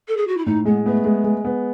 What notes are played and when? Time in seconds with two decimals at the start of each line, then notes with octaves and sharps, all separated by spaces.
0.08 A4
0.17 G#4
0.27 F#4
0.37 E4
0.46 A2 D#4
0.65 G#3 B3
0.86 A3 B3
1.04 G#3
1.24 G#3
1.45 B3